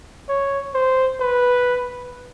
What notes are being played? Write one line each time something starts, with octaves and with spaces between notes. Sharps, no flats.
C#5
C5
B4